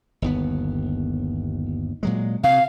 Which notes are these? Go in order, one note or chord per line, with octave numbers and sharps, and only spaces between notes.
G1 D#2 B3
A#2 F#3 G#3
C3 F5